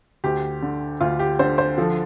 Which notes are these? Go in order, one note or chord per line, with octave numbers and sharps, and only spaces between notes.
D2 G4
D3
D2 F4
G4
D3 C5
C5
F3 A4